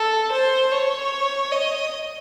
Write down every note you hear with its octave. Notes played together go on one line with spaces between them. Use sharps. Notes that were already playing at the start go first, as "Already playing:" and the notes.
Already playing: A4
C5
C#5
D#5